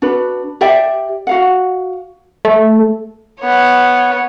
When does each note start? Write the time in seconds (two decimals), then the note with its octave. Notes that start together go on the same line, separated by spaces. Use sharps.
0.02 D4 F#4 B4
0.61 G4 D5 E5 G5
1.27 F#4 F5 F#5
2.45 A3
3.41 B3 C#5